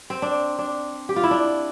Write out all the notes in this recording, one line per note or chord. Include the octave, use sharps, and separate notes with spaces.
C4
D4
D4
G4
F4
E4
D4